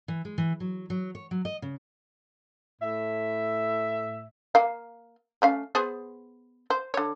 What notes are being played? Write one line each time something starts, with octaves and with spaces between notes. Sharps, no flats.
E3
G#3
E3
F#3
F#3
C#5
F#3
D#5
C#3
A2 E5
A#3 F5
A3 C#4 F5
B3 G#4 C5
C5
D3 C#5